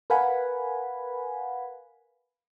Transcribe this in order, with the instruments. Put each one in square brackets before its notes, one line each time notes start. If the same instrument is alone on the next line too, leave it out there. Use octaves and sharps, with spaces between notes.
[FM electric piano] A#4 B4 F5 F#5 G#5 B5